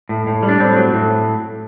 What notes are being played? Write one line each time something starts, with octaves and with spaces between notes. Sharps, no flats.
A2
A2
G3
D4
A2 C4
F#3
A2